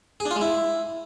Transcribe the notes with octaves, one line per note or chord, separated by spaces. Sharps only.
G#4
D4
F4
G#3
E4